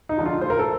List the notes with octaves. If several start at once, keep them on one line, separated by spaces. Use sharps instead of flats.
D#4
D3 F3
F4
D2 C5
A#4
A4